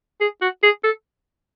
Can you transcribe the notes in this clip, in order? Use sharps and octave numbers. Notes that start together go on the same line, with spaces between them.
G#4
F#4
G#4
A4